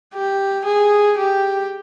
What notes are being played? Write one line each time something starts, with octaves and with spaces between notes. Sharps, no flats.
G4
G#4
G4